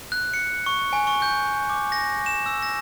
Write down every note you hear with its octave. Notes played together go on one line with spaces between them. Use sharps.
F#6
C#7
C#6
G#5
C#6
G6
D6
A#6
E7
E6
A#6